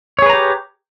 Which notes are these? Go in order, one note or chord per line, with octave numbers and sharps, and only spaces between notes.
G4 G#4 B4 C#5 A#5